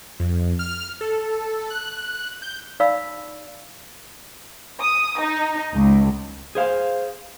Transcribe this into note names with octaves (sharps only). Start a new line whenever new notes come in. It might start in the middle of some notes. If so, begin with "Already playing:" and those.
F2
F6
A4
F#6
G6
D#4 D5 F5 B5 E6
D#6
D#4
C#2
G#4 C5 F5